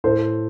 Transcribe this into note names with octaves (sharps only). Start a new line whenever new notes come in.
A2 A4 C5